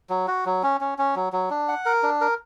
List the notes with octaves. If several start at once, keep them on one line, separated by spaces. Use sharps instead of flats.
F#3
F#4
F#3
C#4
C#4
C#4
F#3
F#3
D4
F#5
A#4
D4
A#4